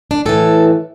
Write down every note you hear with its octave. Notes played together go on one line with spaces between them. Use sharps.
D4
A2 E3 A4